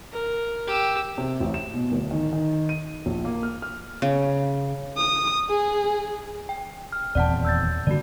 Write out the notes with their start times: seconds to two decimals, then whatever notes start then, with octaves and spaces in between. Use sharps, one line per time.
0.12 A#4
0.67 G4 E6
1.18 C3
1.40 A1
1.54 E7
1.74 B2
1.92 D1
2.11 D#3
2.33 D#3
2.69 D#7
3.06 A#1
3.25 A#3
3.43 F6
3.62 F6
4.02 C#3
4.97 D#6
5.50 G#4
6.49 G5
6.92 F6
7.15 D#1 E2 C4 D5 F#5 A5
7.45 E6 G6 A6
7.87 D3 G3 A#3 F#4 D5